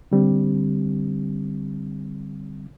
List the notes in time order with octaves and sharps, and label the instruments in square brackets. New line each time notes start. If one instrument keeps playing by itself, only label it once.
[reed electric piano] D3 G3 C4